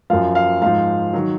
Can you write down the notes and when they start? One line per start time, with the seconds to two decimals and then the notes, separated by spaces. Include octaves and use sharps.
0.10 F#2 F3 F5
0.35 F5
0.61 G#2 F3 F5
1.13 D#3 F#3